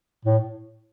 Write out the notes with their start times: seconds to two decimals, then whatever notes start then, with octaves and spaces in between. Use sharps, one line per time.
0.25 A2